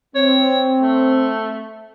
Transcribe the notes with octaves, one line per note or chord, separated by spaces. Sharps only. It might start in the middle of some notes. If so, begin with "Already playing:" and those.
C4 C#5
A3